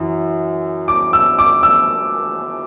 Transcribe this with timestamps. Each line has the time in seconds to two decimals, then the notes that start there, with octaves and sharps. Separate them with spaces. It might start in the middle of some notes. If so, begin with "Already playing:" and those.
Already playing: F#2 E3
0.88 D6
1.13 E6
1.39 D6
1.63 E6